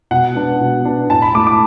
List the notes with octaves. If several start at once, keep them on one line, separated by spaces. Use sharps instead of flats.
B2 F#5
B3 D4
B2
B3 D4
A2 A5
B5
A3 E4 D6
D6